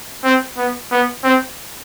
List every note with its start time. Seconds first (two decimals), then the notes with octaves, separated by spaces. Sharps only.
0.24 C4
0.57 B3
0.91 B3
1.24 C4